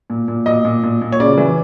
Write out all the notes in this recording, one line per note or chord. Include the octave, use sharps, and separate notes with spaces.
A#2
A#2
A#2 D#5
A#2
A#2
A#2
C#5
C#3 D5
E3